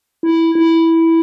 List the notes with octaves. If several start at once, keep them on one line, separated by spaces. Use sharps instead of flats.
E4
E4